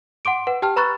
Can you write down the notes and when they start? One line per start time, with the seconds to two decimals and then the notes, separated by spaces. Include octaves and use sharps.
0.25 F#5 C6 D6 D7
0.47 B4 F#5
0.62 G4 G5 A5 F6
0.76 B4 A#5 B5 C#6 F#6 A6